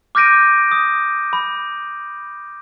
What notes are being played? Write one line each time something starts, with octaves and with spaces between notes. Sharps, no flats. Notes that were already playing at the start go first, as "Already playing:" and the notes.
D6 F6 G6 A#6 D7 D#7
D#6
B5